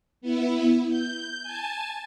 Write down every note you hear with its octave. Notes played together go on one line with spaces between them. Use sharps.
B3 E4
G6
G#5 A5